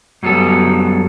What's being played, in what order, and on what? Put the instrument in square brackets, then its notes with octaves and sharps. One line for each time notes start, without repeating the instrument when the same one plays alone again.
[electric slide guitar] F#2 F#3 G3 B3 A4